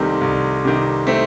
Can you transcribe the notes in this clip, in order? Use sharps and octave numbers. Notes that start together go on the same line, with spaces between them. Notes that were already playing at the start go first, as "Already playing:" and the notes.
Already playing: C2 C3 D#3 A3 C4
C2
C3 D#3
A3 C4